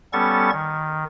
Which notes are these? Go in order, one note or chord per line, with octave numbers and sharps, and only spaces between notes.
G3 B3 C#4 A4 C#6 A6
D#3